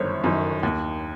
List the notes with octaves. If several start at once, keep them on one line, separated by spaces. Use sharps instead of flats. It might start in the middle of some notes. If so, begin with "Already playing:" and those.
Already playing: G1 F#2 D#3 C5 C#5
F#2 D#3
D#2